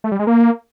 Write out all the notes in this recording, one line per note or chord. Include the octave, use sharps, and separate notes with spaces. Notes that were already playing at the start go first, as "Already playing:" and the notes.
A3
G3
G#3
A#3